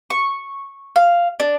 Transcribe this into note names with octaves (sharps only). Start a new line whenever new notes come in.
C#6
F5
D4